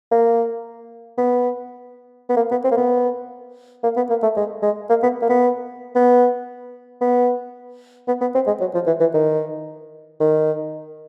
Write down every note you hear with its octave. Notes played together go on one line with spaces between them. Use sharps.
A#3
B3
B3
A#3
B3
C4
A#3
B3
A#3
B3
A#3
A3
G#3
G#3
A#3
B3
A#3
B3
B3
B3
B3
B3
C4
G#3
F#3
F3
E3
E3
D#3
D#3